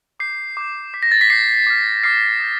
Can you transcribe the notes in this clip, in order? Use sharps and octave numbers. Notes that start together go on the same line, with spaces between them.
D6 G6 C7
D6 G6
D6 G6 B6
A#6
A6
B6
D6 G6 C7
D6 F6
D6 F6 C7
D#6 G6